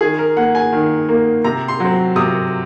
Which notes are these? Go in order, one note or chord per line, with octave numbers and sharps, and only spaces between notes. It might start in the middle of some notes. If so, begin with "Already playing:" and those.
D#3 G#4
A#4
A#3 F#5
G#5
D#3
A#3
C3 A#5
C6
F#3 C4
C3 D#6